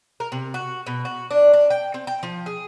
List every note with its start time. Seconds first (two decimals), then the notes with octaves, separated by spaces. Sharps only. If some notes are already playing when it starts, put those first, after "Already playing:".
0.20 A#4
0.32 C3
0.54 F#4
0.86 B2
1.05 F#4
1.31 D4
1.53 D4
1.70 G5
1.94 C4
2.07 G5
2.23 F3
2.46 G#4